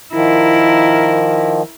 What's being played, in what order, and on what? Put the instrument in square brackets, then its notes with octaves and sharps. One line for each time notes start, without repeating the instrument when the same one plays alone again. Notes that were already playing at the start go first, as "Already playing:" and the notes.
[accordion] D#3 F3 [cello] E4 A#4